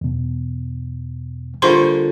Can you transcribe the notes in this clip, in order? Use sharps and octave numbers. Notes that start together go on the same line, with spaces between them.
E2 B2
D3 G3 A#3 F4 C5 C6